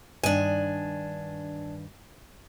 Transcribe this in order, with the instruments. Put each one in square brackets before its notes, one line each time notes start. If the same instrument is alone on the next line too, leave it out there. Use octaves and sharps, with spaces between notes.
[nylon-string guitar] G2 D#3 D#5 [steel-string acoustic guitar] D4 G#5